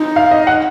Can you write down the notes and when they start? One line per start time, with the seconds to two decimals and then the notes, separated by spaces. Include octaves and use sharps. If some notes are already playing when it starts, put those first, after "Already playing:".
Already playing: D#4
0.16 F5
0.31 D#5
0.47 F#5